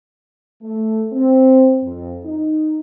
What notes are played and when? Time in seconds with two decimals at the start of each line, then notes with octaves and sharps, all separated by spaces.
0.62 A3
1.13 C4
1.83 F2
2.24 D#4